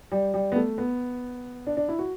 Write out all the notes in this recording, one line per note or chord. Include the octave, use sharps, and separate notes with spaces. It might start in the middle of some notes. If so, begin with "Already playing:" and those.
G3
G3
B3
A3
B3
D4
D4
E4
F#4